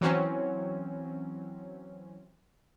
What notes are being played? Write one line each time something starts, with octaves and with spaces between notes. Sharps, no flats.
E3 F#3 C4 C#4